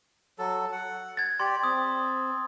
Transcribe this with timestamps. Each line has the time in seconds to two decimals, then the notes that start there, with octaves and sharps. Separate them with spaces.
0.39 F#3 A4
0.72 F#5
1.17 G#6 A6
1.40 G4 D5 C6
1.64 C4 D#6